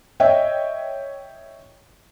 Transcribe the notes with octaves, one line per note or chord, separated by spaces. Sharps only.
C#5 D#5 E5 G5